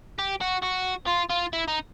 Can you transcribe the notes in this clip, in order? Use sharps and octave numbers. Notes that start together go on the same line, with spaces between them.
G4
F#4
F#4
F4
F4
E4
D#4